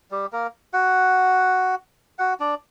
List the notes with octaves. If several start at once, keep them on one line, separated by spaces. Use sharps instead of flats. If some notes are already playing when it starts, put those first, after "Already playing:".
G3 G4
A#3 A#4
F#4 F#5
F#4 F#5
D4 D5